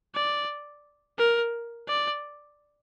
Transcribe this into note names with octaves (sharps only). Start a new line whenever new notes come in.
D5
A#4
D5